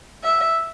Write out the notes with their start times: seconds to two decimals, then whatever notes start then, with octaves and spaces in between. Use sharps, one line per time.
0.24 E5